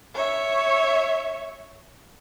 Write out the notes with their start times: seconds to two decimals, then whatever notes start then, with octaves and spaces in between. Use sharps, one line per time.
0.15 C#5 E5